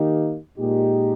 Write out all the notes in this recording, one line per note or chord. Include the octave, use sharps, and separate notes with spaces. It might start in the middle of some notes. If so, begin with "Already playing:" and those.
Already playing: D#3 A#3 D#4 G4
A#2 G#3 D#4 G4